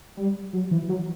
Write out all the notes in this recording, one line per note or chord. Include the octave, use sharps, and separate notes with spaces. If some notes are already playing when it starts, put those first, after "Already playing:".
G3
F#3
E3
F#3